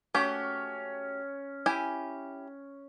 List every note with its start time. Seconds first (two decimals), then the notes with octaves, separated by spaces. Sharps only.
0.14 A3 C#4 F#4 G4
1.66 E4 G4 G#5